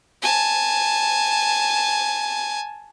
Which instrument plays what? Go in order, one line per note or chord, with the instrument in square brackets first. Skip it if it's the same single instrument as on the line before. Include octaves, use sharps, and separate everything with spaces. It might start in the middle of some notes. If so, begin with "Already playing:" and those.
[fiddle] G#5 A5